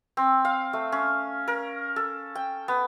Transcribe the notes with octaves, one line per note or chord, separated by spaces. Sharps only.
C4
F5
A3
C#4
A#4
A4
G5
B3